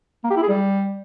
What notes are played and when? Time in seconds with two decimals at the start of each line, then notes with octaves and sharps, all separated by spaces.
0.24 A#3
0.30 G4
0.37 E4
0.43 G#4
0.49 G3